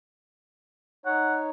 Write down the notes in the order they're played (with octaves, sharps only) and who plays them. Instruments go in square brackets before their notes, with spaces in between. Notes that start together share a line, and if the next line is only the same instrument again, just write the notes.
[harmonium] D#4 C#5 [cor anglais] F#5